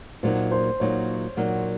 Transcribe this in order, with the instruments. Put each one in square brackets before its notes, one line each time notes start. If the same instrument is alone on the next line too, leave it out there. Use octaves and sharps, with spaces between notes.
[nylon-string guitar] A#2 F#3 A#3 D#4 [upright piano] C5
[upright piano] C5
[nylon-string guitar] A#2 F#3 A#3 D#4 [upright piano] C#5
[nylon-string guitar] A#2 F#3 A#3 D#4